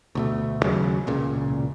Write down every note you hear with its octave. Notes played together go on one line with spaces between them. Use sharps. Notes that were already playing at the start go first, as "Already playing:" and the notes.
D2 B2 A3
D#2 C#3 F#3
E1 C#2 A#2 C#3